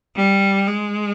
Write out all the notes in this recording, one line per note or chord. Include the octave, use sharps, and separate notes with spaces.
G3
G#3